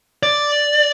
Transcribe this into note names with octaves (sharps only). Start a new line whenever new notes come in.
D5